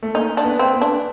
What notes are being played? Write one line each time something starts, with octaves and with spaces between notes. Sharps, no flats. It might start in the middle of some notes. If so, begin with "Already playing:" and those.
A3
A#3 D#4
D4
B3
C4
B3
D4